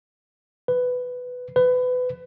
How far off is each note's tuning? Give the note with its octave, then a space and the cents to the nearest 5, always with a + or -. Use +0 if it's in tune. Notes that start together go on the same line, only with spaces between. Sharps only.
B4 +10
B4 +25